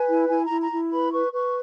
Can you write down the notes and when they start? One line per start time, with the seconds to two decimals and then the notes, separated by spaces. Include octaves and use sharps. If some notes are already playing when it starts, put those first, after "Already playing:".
Already playing: B4 G#5
0.09 E4
0.29 E4 G#5
0.45 A#5
0.50 E4
0.61 A#5
0.71 E4
0.92 B4 B5
1.12 B4 C#6
1.33 B4 C#6